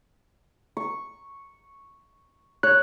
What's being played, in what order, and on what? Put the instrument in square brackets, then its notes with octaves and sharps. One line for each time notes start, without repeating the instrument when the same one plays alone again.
[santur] C#6
[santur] C#5 [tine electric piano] F#6